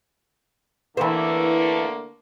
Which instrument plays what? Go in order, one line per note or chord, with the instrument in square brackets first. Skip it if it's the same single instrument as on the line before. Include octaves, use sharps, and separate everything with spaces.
[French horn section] D3 A3 A#3 [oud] E3 C5